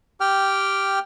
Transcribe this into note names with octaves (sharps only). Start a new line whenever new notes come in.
G4 G5 F6